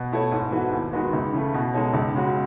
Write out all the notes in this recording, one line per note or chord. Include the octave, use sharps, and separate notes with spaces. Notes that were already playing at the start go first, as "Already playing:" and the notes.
Already playing: B2
A3 E4 A4 C#5
G#2
E3 B3 F#4 A4
D#2
D#3 G#3 B3 F#4
C#2
C#3 E3 A3
B2
G#3 D#4 A4 C#5
C#2
C#3 G#3 C#4 F#4